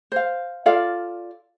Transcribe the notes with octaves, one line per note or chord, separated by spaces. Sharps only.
C5 F5
F4 A4 D5 F5